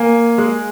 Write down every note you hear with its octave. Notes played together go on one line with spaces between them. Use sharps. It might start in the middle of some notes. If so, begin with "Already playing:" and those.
Already playing: A#3 G#5
G#3